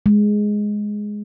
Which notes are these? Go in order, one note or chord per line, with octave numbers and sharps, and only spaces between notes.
G#3